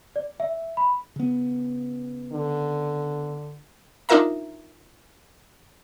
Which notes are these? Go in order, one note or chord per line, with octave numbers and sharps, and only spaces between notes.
D5
E5
B5
C#3 B3
D3
D4 D#4 F4 A#4 E5 A#5